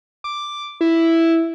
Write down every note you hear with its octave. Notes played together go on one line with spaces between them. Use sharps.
D6
E4